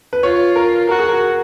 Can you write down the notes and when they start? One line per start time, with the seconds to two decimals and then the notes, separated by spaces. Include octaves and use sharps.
0.13 B4
0.23 F4 C#5
0.56 A#4
0.89 F#4 A#4
0.99 G#4
1.08 A#4